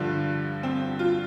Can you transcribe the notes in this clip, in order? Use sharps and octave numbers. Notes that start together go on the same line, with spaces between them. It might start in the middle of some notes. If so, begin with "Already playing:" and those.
Already playing: G2 D3 F3
C4
F4